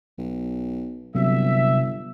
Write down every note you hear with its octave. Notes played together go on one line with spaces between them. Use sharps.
B1
G1 C3 F#3 E5